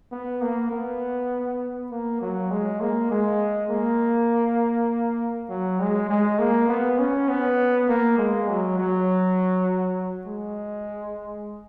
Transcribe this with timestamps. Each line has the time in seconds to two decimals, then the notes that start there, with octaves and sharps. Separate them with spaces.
0.12 B3
0.42 A#3
0.71 B3
1.91 A#3
2.21 F#3
2.51 G#3
2.81 A#3
3.11 G#3
3.70 A#3
5.50 F#3
5.80 G#3
6.09 G#3
6.39 A#3
6.69 B3
6.99 C#4
7.29 B3
7.89 A#3
8.18 G#3
8.48 F#3
8.78 F#3
10.27 G#3